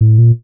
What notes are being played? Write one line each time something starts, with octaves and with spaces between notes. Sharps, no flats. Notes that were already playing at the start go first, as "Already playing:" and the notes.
A2
A#2